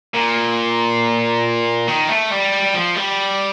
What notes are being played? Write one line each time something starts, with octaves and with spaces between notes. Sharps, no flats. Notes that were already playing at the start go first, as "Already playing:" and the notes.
A#2
D#3
A3
G3
F3
G3